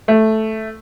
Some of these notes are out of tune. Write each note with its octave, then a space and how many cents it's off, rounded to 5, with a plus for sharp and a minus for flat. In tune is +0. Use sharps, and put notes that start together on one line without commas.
A3 -5